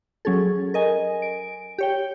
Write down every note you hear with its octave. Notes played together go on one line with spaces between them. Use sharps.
F#3 C#4 G#4 A4
A#4 D#5 G#5
D7
G4 C#5 G5